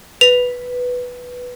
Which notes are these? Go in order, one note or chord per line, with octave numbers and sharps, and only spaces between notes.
B4 F7